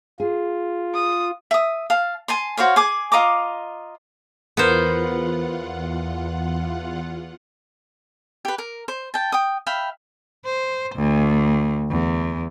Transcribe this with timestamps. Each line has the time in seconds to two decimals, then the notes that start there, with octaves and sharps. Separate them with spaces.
0.20 F4 G#4
0.94 D#6
1.51 E5 D#6
1.90 F5 A5
2.28 G#5 A5 C6
2.57 F#4 C5 C#5 F5
2.76 G#4 G#5 D6
3.12 F4 D#5 A#5 D6
4.57 E2 B3 F4 A#4 C5 F#5
8.45 G4 B4
8.58 A#4
8.88 C5
9.14 G5 A5
9.32 G5 D#6
9.67 E5 F5 G5 B5
10.45 C5
10.95 D2
11.90 E2